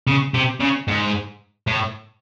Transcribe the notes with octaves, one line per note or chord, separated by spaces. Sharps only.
C#3
C3
C#3
G#2
A2